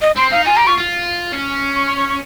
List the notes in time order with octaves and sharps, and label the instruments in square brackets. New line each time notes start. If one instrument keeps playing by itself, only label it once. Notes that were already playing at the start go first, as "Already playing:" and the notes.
[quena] D#5
[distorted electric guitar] C4 [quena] C6
[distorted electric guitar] D#4 [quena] F5
[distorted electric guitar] F4 [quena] G#5
[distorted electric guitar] G4 [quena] A#5
[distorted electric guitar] F4 [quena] C#6
[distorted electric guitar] F4
C#4
[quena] C#6
C#6
C#6
C#6